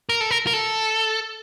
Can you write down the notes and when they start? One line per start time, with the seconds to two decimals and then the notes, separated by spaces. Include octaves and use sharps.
0.09 A#4
0.21 A4
0.31 A#4
0.47 A#4
0.53 A4